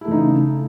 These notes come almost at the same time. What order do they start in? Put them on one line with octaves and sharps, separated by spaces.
E4 A3 E3 D#4 C#3